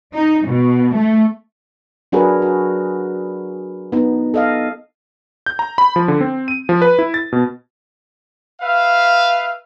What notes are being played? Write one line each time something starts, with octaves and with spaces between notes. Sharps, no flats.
D#4
B2
A3
F#3 D4 F#4 G#4 A#4 B4
F#4
B3 D#4
A4 D#5 F5
G6
A#5
B5
F3
D3
C4
D#7
F3
B4
E4
A6
B2
B4 E5 F5